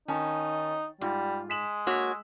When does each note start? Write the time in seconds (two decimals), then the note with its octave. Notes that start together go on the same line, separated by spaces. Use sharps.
0.08 D#3 C#4 D#4 G#5 A5
1.01 G#2 G3 F4
1.50 G#3 B6 E7 F#7
1.87 A#3 F#4 C#5 E6 B6